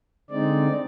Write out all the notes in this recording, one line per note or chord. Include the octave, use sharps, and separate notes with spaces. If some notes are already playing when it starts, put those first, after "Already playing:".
D3 G#3 C4 D#4 D5